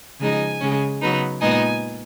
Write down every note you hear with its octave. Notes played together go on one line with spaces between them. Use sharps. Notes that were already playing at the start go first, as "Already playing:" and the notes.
C#3 F3 G#3 D#4 G#5
C#3 G#3 C#4
C#3 F#3 B3 D#4
A#2 G#3 B3 D#4 G#5